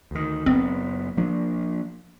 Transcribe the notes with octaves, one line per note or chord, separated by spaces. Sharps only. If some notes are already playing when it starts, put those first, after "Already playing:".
D2 D#3
F#1 B3 C4
F3 A#3 D4